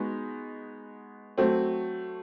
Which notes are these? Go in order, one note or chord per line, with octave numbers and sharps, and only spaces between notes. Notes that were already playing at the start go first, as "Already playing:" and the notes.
Already playing: G#3 B3 D#4 F#4
F#3 A3 C4